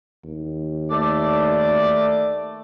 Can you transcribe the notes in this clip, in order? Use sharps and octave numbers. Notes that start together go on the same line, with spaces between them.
D#2
A3 D5